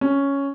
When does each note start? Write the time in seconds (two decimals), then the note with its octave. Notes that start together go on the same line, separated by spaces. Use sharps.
0.01 C#4